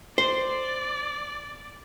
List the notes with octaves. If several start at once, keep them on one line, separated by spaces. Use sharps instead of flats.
C5 D5